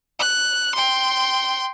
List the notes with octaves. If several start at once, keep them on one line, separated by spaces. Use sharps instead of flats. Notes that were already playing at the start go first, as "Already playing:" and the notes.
F#6
G5 C6